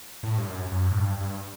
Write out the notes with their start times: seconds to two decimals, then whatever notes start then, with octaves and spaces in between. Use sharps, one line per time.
0.23 A2
0.38 G2
0.48 F#2
0.72 F#2
0.91 A2
0.97 G2
1.21 G2